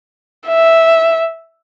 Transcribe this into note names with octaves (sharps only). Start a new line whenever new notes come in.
E5